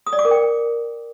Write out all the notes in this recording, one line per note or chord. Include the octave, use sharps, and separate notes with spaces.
D#6
D5
D6
A#4
G5